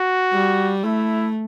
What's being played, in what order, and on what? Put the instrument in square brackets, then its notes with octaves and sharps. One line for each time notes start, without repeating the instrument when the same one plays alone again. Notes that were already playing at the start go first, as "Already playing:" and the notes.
Already playing: [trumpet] F#4
[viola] G3
[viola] A3 [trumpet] E4